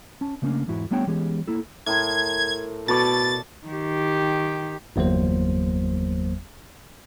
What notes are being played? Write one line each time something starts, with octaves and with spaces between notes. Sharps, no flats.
C#4 A5
C#3 A3 A#3 C#4 D4
E2 G#2 E4 F#4
G3 A3 B3 D4 C#5 G5
E3 G#3 B3 C#4 G4 G#4
A#3 E4 A4
A2 A#4 C6 G#6
B2 A4 C#5 D5 A6
D#3 G4
G1 E2 F#3 A#3 C5